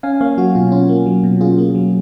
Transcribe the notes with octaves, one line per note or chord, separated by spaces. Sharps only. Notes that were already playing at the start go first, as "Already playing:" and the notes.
C#4 F5 G#5
A#3 C#5 F5
F#3 F#4
B2 F4
C#4 F4
A#3
F#3
B2
C#4 F4 G#4
A#3
F#3